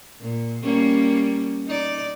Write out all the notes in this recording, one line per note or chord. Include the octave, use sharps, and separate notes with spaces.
A#2
G3 A#3 C#4
D#4 D5